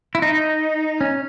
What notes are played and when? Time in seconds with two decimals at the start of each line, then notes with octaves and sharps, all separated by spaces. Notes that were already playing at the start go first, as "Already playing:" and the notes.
0.15 E4
0.22 D#4
1.01 C#4